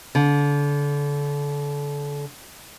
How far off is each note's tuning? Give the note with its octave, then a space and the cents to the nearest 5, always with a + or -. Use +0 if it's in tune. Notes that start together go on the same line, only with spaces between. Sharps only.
D3 -30